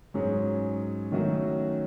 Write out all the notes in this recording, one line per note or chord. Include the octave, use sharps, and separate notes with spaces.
G#2 F#3 C#4 G#4
D#3 F#3 A3 C#4 F#4